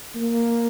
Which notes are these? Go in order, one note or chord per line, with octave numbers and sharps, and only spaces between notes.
A#3